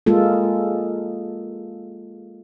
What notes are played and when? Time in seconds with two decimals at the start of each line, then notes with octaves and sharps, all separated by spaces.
0.06 G#3 A#3 F4 A4